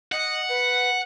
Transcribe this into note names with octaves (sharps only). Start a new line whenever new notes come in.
D#5 F#5
B4